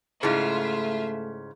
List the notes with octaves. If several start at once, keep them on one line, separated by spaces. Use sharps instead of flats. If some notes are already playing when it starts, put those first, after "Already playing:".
G#2 C#3 A3 E4 F4 G#4 E5